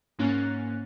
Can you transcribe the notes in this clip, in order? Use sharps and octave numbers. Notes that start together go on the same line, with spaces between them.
G#2 A#3 C#4 F#6 A6